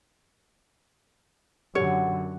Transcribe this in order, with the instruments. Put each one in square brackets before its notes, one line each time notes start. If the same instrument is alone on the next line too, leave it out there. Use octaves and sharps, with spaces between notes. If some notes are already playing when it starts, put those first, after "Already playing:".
[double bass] F#2 D3 [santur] F#4 [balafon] G4 [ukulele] C#5